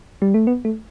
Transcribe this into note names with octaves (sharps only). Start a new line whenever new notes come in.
G3
A3
B3
A3